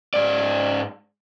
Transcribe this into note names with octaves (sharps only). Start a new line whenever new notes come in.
G#2 D5